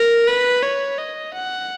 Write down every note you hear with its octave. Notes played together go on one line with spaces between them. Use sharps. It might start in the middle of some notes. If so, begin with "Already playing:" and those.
Already playing: A#4
B4
C#5
D#5
F#5